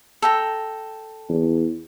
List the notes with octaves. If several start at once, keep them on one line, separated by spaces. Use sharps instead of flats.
A4 G5 A#5
E2